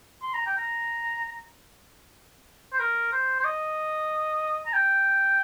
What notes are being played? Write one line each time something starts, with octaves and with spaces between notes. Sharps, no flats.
C6
A#5
G5
A#5
C5
A#4
C5
C5
D#5
A#5
G5